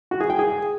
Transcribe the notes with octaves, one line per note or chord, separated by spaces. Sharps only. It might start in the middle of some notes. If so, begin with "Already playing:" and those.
F#4
G#4
G5
G#4